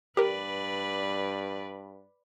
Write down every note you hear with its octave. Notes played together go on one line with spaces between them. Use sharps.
G2 G4 A#4 B4 D5